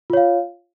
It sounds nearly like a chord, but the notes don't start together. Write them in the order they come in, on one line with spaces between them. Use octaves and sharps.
F4 C#5 F5